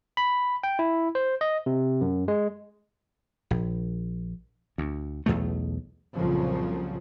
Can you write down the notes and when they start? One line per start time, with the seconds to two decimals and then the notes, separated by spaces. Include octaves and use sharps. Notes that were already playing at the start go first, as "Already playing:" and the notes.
0.17 B5
0.63 G5
0.79 E4
1.15 C5
1.41 D#5
1.66 C3
2.01 F#2
2.28 G#3
3.51 A#1
4.78 D2
5.26 B1 E2 B2 A3
6.15 C2 F2 A#2 C#3 F3 F#3